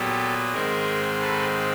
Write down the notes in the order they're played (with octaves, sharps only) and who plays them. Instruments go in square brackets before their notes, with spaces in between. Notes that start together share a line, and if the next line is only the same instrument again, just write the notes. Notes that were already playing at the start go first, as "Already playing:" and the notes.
Already playing: [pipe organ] A#2 F#3 B3 G4 A4
G#2 D#3 G#3 C4 G#4 A#4
A4 B4